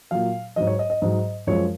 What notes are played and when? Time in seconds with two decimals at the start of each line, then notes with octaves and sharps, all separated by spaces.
0.11 A#2 F#3 F5
0.56 G#2 F#3 D#5
0.67 C#5
0.79 D#5
0.90 D#5
1.02 G#2 F#3 D#5
1.47 F#2 F3 G#3 C#5